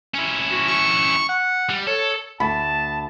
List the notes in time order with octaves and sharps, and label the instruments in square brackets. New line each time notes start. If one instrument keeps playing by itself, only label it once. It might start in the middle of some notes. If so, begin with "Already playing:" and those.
[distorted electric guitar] C#4 E4
[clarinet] F#4
C#6
F#5
[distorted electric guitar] G3
[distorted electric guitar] A4 [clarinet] C#5
[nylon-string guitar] D2 [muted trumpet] A5 [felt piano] B5